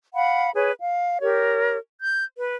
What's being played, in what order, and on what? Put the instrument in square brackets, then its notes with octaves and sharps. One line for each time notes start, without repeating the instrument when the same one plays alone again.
[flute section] F5 F#5 B5
G#4 B4 C#5
F5
G4 A#4 C#5
G6
B4